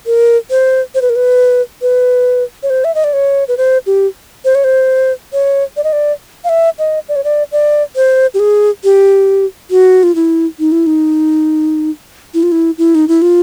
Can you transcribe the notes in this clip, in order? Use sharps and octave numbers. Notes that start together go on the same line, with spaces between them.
A#4
C5
C5
B4
A#4
B4
B4
C#5
C5
E5
D#5
D5
C#5
B4
C5
G4
C5
C#5
C5
C#5
D5
D#5
D5
F5
E5
D#5
D5
C#5
D5
D5
C5
G4
G#4
G4
F#4
F4
E4
D#4
E4
D#4
E4
F4
E4
E4
D#4
E4
F4